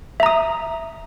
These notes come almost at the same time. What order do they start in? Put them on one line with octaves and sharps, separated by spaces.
E5 A#5 D#6